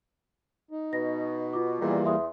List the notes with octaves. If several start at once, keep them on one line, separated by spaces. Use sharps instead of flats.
D#4
B2 A#6
F4 D6
E2 A#2 D#3 E3 G3 A#3
E2 E5 C6 D#6